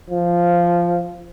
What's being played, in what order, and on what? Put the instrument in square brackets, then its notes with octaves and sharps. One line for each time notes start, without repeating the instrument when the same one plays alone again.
[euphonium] F3